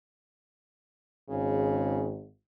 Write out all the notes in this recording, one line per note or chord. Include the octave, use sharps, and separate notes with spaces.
G#1 C#3